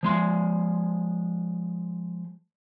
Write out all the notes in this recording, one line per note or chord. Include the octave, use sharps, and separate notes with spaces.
F3 G#3 C6